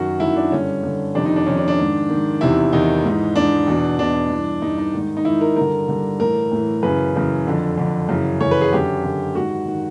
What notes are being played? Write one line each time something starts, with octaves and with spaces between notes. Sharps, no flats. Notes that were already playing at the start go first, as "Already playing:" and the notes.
Already playing: F#2 D#3 F#4
F#2 D#3 E4
D4
G2 D3 C#4
G2 D3
F2 C3 D#3 D4
D#4
D4
F2 C3 D#3 C#4
D4
D4
G#2 D#3
G#2 D#3
E2 C3 D#3 E4
E2 C3 D#3 D#4
G#2 E3
G#2 E3 D4
E2 B2
E2 B2 D4
G2 E3
G2 E3 D#4
D#4
G#2 D#3
D#4
G#2 D#3 E4
A#4
G2 D3 A#4
G2 D3
A2 E3 A#4
A2 E3
F#2 C#3 E3 B4
F#2 C#3 E3
F2 D3
F2 D3
F#2 C#3 E3
F#2 C#3 E3 C#5
B4
G#4
F#2 D3 G4
F#2 D3
G#2 D#3 F#4
D#3